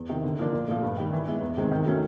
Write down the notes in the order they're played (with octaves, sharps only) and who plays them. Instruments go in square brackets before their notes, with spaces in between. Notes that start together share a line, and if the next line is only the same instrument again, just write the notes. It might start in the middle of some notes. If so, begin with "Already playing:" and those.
Already playing: [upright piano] E2
C3 D#3
D3
F3 A#3 D4
A#2
F3 A3
G2
D#3 G3
E3
G#3 B3 E4
E2
C3 D#3 G#3 C4
D#3
F#3 A3 C#4